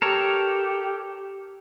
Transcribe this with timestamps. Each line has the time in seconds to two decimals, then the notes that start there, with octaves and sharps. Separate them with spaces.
0.02 G4 A4 A#4 C#5